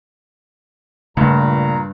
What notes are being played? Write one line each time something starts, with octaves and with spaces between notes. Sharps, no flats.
C#2 G2 A#2 C#3 A3 A#5